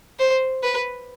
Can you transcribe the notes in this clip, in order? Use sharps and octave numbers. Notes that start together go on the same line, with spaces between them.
C5
B4